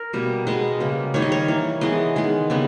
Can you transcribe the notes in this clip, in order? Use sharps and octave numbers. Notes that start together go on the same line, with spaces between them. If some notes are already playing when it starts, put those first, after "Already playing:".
Already playing: A#4
B2 G3 A#3
B2 G#3 B3 D#5
C#3 G3 A#3
D#3 G3 A#3 C#5
D#5
C#5
E3 A#3
E3 G#3 B3 D#5
D#3 G#3 B3
C#3 G3 B3